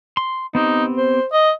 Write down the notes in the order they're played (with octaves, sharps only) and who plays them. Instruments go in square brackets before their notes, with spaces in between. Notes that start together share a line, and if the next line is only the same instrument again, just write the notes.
[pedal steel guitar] C6
[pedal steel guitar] B3 C4 G4 [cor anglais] D#4
[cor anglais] C5
D#5